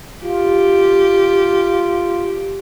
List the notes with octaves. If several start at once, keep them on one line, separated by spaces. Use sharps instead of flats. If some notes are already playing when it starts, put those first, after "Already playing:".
F4 G4